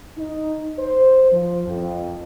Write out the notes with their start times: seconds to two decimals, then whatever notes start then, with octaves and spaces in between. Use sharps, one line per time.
0.17 D#4
0.79 C5
1.32 F3
1.67 F2